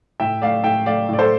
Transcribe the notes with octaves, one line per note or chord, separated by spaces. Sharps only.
A2 E5 G5
A3 D5 F5
A2 E5 G5
A3 D5 F5
A2 D5
A4 C5